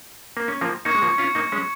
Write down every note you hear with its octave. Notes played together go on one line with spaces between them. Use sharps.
A#3
C#4
F3 A#3
A#3 D#4 C#6 G#6 C#7
G#3
F3 A#3
C#4 F4
A#3 D#4
G#3 C#4